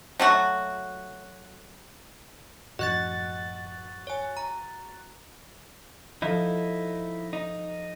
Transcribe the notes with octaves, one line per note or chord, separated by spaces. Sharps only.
F#3 A3 F#4
F#2 A2 F3 F#4 D#5 F#6 A6
C#5 G#5
A#5
F3 D#4 E4 A4 F6
D#4